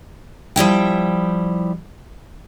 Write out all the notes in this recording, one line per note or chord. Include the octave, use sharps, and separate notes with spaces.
F3 G3 E4 G5